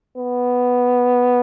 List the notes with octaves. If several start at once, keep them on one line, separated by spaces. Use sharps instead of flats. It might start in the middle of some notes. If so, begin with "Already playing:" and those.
B3